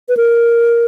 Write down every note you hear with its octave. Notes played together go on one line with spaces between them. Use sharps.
B4
A#4